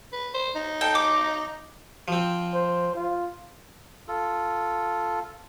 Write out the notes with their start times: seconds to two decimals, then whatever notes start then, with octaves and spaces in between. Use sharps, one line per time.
0.13 B4
0.34 C5
0.55 D#4
0.81 A4 G5
0.95 D6
2.08 F3 C4
2.54 C5
2.95 F4
4.08 F4 A4